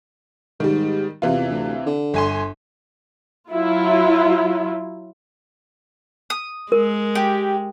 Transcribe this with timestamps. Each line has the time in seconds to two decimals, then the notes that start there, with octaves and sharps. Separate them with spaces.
0.60 G#2 D#3 G3
1.22 E2 C3 E3 F4
1.51 D2
1.86 D3
2.14 G1 G#5 C6
3.51 F#3 E4 F4
6.30 D#6
6.72 G#3 A#4
7.15 G4